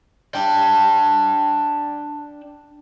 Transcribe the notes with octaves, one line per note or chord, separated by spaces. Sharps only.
D4 G5